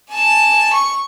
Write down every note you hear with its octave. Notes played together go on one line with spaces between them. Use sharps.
G#5 A5
C#6